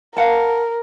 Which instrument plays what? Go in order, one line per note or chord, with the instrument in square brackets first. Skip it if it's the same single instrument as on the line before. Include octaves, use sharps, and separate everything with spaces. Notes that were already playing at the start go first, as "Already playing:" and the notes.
[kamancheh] A#4 [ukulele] F5 F#5 A5